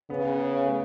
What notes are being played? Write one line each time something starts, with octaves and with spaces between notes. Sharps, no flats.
C#3 B3
A3